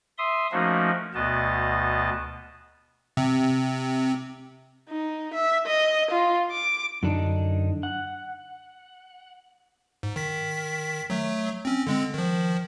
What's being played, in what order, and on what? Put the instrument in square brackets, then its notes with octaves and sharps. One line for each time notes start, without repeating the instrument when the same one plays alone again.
[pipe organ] E5 C6 D#6
F3 A3 A#3 C#4 D#4 F#4
D2 B2 B3 D#5 A5
[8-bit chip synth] C3
[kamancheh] D#4
E5
D#5
F4
D6
[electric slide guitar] F#2 D3 D4 D#4
F#5
[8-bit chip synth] G#2
D#3 B6
F#3 A3
C4 C#4
D3 G#3 C4
D#3 F3